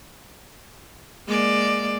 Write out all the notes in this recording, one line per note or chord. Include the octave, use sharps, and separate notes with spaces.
G#3 A#3 D5